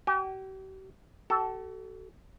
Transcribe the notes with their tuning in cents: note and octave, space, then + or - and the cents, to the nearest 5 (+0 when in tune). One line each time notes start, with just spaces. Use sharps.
G4 -45 G5 +45
F#4 +45 A4 +0